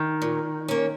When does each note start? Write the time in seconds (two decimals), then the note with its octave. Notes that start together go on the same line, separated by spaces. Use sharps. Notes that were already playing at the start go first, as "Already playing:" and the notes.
Already playing: D#3
0.22 A#2
0.68 A#3 C#4